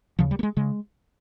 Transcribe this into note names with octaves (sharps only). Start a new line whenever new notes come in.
D#2 C#3 F3
G3
A#3
G#3
C#3 G#3